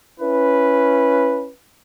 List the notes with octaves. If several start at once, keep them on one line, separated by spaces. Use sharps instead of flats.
C#4 E4 B4